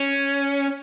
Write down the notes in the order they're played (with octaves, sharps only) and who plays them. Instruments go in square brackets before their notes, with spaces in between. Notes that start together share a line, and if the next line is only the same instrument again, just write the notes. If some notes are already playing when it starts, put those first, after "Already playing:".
Already playing: [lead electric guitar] C#4